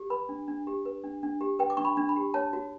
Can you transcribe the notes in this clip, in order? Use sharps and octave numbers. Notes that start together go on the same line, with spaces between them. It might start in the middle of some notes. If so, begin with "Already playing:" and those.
Already playing: G4
B4 B5
D4
D4
G4
B4
D4
D4
G4
B4 G5
D6
D4 C#6
B5
D4
B5
G4
C#5 A5
F#4